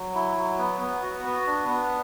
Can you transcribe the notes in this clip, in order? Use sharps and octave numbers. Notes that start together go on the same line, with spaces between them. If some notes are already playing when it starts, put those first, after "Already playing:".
Already playing: F#3
E4
F#3
B3
B3
F#4
B3
D4
B3